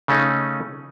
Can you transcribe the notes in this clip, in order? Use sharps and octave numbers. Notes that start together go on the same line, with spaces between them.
C#3 A3 C#4 D#4